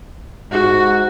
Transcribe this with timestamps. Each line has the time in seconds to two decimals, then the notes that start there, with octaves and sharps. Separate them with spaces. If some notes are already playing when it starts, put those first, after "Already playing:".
0.52 G#2 F#4